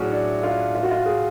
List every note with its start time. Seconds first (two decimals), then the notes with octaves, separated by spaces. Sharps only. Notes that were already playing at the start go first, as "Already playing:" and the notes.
Already playing: A2 F#3 C#4 D4 F#4 G#4
0.12 D4
0.43 F4
0.75 F4
0.83 F#4
0.91 F4
1.06 G#4